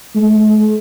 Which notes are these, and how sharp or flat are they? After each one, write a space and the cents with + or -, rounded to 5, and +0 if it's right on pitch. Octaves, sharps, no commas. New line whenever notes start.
A3 -45